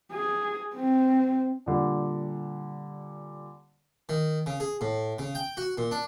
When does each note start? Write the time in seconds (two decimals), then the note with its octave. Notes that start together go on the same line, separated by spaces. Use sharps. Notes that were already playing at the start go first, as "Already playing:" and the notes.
0.12 G#4
0.74 C4
1.66 A#2 D3 G3
4.09 D#3
4.46 C#3
4.60 G#4
4.81 A2
5.19 C#3
5.35 G5
5.57 F#4
5.78 A#2
5.91 D4